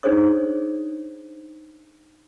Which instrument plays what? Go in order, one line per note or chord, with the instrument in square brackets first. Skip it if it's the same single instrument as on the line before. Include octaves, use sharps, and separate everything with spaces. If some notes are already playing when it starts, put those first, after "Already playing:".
[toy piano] D4 D#4 G#4 C5 C#5 D#6